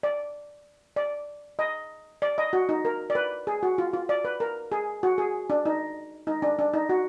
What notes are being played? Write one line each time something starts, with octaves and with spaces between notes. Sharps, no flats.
D5
D5
D#5
D5
D#5
F#4
D#4
A#4
D5
B4
G#4
F#4
F4
F4
D5
B4
A#4
G#4
F#4
G#4
D4
D#4
D#4
D4
D4
D#4
F#4